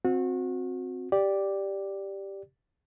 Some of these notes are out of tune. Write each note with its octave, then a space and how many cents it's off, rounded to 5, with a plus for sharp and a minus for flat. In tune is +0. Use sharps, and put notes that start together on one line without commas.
C4 +0 F#4 -30
G4 +0 D5 +0